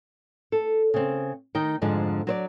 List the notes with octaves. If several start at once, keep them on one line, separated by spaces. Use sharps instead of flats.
A4
C#3 C4
D#3 D#4 G5
F2 G#2 D3 F3 G#3
F#3 C5 D5